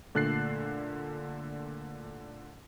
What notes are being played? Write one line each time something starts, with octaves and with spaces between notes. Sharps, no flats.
A#2 D3 A3 F#6 A6 C7